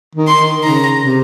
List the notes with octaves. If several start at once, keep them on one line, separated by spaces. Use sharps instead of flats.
D#3
C6
D#3
C#3 A#5
C3